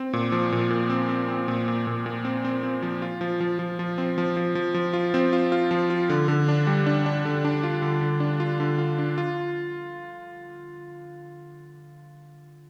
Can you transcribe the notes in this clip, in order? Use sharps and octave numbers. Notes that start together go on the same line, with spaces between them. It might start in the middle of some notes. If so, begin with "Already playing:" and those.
Already playing: C4
A#2
F3
A#2
A#2
C4
C4
C4
A#2
A#2
A#2
A#2
C4
C4
C4
F3
F4
F3
F3
F3
F3
C4
F3
F3
F3
F3
F4
C4
F4
F4
F3
F4
D3
D3
D4
G3
D4
D4
D3
D4
F4
D3
D3
D4
F4
D3
F4
D4
F4